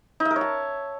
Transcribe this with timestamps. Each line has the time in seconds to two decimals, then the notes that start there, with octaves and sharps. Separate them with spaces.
0.20 D#4
0.25 E5
0.31 A#4
0.36 C#5
0.41 A5